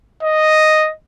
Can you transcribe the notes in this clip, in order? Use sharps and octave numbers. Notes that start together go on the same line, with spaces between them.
D#5